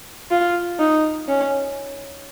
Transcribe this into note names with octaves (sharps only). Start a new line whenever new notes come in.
F4
D#4
C#4